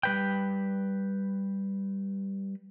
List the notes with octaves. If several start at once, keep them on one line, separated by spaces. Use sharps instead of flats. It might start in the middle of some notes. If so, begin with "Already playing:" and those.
G3 B4 G5